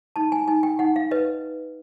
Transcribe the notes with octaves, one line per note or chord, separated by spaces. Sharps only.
D#4 A5
G#5
D#4 G#5
G5
D#4 F#5
F5
B4 D#5